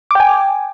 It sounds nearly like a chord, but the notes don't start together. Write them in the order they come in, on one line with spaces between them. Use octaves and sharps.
D6 G5 G#5